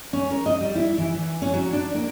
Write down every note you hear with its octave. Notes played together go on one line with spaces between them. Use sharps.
C#4
A#4
D#5
G3
E4
E3
E3
C#4
F#3
D4
A#3